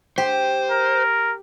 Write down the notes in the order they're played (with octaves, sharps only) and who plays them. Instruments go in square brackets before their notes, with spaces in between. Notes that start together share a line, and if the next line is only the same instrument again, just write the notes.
[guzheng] G4 [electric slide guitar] C5
[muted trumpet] A#4